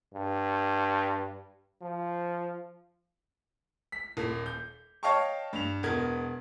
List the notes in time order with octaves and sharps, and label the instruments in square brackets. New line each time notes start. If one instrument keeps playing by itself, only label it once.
[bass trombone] G2
F3
[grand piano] B6
D#1 A#3
G6
C#5 D#5 F5 G5 A5 C#6
G2 F7
E1 B3 A#4 G#6